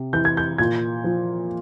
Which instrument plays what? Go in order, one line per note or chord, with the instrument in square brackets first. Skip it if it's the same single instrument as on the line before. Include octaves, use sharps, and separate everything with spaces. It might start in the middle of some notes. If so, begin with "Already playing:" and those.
Already playing: [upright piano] C3
E3 G6
G#6
G6
A#2 G#6
F3